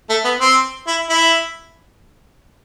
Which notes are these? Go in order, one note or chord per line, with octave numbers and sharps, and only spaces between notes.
A3
B3
C4
E4
E4